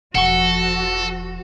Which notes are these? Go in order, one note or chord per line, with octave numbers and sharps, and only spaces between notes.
E1 F3 F#4 A4 F#5 C#6